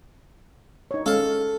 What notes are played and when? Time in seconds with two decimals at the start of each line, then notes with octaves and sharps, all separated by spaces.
0.91 D#4 C#5
1.06 G#3 C#4 A4 F5